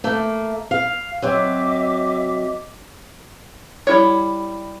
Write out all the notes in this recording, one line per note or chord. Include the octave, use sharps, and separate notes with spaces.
A3 A#3
F5
F#3 C4 D#5 E5 D6
G3 E4 C#5